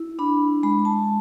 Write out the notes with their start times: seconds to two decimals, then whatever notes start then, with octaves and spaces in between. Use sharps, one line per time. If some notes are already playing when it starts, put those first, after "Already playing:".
Already playing: E4
0.19 D4 B5
0.63 G#3 B5
0.85 A5